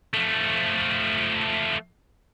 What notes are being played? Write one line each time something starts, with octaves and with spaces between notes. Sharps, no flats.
F3 A3